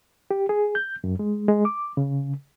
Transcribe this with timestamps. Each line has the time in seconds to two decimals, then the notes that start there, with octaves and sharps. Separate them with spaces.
0.31 G4
0.49 G#4
0.75 G6
1.04 F#2
1.19 G#3
1.48 G#3
1.65 D6
1.97 C#3